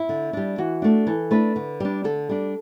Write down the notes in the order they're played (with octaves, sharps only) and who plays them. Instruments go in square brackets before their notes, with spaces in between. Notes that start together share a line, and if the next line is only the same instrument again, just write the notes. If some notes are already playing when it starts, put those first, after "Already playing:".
Already playing: [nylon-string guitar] E4
D3
G3 D4
E3 F#4
A3 D4
E3 A4
A3 D4 B4
D3
G3 D4
D3 A4
G3 D4